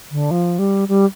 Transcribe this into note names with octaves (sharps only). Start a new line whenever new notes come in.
D3
F3
G3
G3